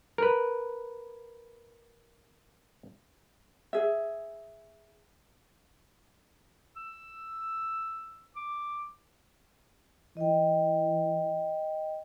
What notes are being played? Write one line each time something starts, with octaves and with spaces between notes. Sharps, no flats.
A#4 B4
G#4 E5
E6
D6
E3 D#5 G5